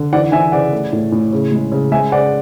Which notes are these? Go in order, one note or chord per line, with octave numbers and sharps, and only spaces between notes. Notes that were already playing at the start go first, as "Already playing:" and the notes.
Already playing: D3
E3 D5 F#5
E3 E5 G#5
C#3 D5 F#5
A3
A2
A2
C#3
G#3
C#3
G#3 E5 G#5
C#3 D5 F#5